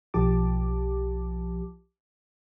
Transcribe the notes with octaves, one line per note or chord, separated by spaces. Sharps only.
B1 F3 G4 A5 D6